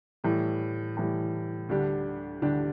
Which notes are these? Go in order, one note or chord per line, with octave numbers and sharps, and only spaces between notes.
A2 E3 G3
A2 E3 G3
D2 D3 G3 D4 G4
D2 D3 G3 D4 G4